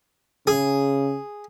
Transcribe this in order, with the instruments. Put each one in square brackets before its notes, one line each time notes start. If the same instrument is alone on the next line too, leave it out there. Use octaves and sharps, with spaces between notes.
[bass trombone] C#3 [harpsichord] G#4